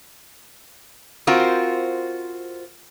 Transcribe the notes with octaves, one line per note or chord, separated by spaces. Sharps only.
C4 F4 F#4 A#4 C5